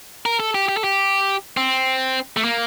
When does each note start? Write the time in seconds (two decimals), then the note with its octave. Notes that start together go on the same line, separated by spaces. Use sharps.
0.26 A#4
0.40 A4
0.55 G4
0.69 G4
0.77 A4
0.84 G4
1.57 C4
2.37 A3
2.44 A#3